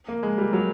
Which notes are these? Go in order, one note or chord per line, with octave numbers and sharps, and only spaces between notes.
A#3
G#3
G3
F#3